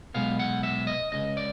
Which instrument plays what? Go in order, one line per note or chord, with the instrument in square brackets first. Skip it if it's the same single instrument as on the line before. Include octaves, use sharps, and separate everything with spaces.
[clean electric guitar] B1 B2 G#3 B3 F5
F#5
E5
D#5
C#2 C#3 D#5
D5